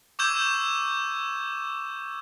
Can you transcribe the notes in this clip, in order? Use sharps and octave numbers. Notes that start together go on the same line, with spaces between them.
C#6 D6 E6 G6 G#6 E7